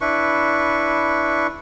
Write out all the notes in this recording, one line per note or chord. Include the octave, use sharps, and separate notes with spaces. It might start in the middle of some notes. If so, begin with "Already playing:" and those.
D4 E4 B4 C#6